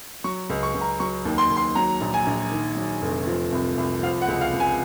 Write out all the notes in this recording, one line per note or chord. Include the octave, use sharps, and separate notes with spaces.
F#3 C#6
C#2
C#6
C#2
A#5
F#3 C#6
D#2
C6
D#2
C6
F#3 A#5
A#1
G#5
A#1
D#3
F#3
F1
F3
C2
C2
F3 F5
F#5
C#2
F5
C#2
G#5